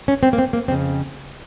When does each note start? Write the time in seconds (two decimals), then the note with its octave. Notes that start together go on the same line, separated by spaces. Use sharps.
0.08 C#4
0.23 C4
0.33 A#3
0.38 C4
0.53 A#3
0.68 F2 C4
0.71 C#3